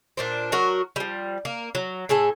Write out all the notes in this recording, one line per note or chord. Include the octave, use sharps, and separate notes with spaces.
A#2 D4 C5
F#3 F#4 A#4
F3 G3
A#3
F#3
A2 G#4 A4 G#5